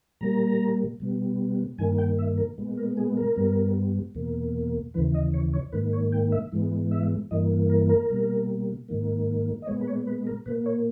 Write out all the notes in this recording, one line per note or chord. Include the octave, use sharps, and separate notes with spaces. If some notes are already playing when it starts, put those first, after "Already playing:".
A#2 G3 A#3 A#5
B2 G3 B3
G2 D#3 A#3 G#5
G5
E5
A#4
A#2 G#3 B3
A#4
G#4
A#4
G2 G3 B3
E2 B2 A#3
D#2 C#3 E3 B4
D#5
C#5
C#5
G#2 D#3 A#3 B4
C#5
G5
E5
G#2 E3 G#3 B3
E5
G2 E3 A#3 D#5
A#4
A#4
B2 G3 A#3
G#2 D#3 A#3
D#5
A#2 G#3 B3 C#5
B4
C#5
B4
A#4
A#2 A#3 B4
C#5